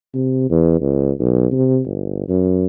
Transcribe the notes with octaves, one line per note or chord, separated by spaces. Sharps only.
C3
E2
C#2
B1
C3
G1
F#2